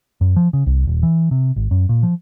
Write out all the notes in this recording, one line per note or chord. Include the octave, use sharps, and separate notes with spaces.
F#2
F3
C#3
C2
D#1
E3
C3
G#1
F#2
A#2
F3